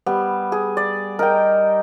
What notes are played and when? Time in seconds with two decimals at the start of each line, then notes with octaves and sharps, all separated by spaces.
0.06 G3 B3
0.52 G#4
0.77 D5
1.19 D#4 A#4 G5